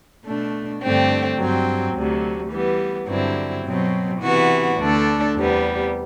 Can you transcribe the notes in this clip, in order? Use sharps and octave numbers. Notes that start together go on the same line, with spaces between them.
B2 A3 D4
G2 D3 A3 C4 G4
G2 F#3 C4
D2 C3 F#3
E3 G3 B3
G2 D3 F#3 C4 E4
B2 F#3 C4
C3 E3 B3 F#4
D2 D3 A3 D4 A4
E2 C3 G3 B3